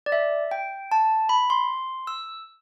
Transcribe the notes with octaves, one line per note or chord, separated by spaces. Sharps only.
D5
E5
G5
A5
B5
C6
E6